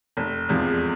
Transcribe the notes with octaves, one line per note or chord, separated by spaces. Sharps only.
F1
E2 C3 F3 G#3